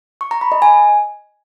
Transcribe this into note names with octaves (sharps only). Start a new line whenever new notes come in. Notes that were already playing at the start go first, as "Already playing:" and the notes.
C#6
A#5
B5
D#5
G#5